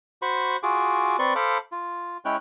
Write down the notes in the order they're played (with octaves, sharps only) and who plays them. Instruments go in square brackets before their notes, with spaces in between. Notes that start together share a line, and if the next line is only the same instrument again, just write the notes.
[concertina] F#4 C5 B5 C#6
F4 F#4 G#4 D6
C4 B4 D5 C6 C#6
A4 C5 F5 B5 D6
F4
G#3 C#4 E4 C#5 G5 F#6